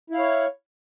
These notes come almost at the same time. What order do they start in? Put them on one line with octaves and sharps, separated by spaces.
E4 F5 C#5